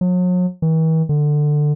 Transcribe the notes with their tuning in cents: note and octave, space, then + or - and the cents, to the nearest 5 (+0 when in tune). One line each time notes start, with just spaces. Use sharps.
F#3 -40
E3 -45
D3 +15